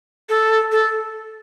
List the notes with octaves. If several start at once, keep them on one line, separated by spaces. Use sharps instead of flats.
A4
A4